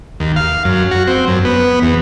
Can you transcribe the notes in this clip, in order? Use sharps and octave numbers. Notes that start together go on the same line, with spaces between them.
D#2
F5
F#2
F#4
C4
F#2
B3
E2